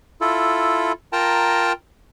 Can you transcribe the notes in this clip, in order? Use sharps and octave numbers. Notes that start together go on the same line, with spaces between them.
E4 F4 A4
F4 A#4 G5 A5 A#5